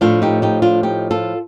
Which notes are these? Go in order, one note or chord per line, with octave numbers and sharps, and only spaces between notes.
A2 F3 A3 D4 F4
D#4 G4
D#4 G4
D4 F4
D#4 G4
F4 A4